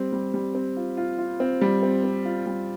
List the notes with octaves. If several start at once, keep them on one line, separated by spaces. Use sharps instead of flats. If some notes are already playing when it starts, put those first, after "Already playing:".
Already playing: G3 C4
G3
G3
C4
F4
F4
F4
C4
G3
C4
C4
F4
G3